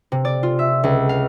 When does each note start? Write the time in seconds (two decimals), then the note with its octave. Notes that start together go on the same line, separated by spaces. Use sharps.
0.12 C3
0.25 D5
0.43 F4
0.59 E5
0.84 C#2
1.09 F5